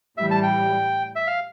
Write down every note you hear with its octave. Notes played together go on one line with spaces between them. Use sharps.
A2 E3 G3 E5
A5
G5
E5
F5